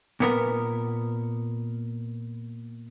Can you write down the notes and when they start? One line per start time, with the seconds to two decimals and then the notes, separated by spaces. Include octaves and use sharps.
0.20 A#2 B3 A#4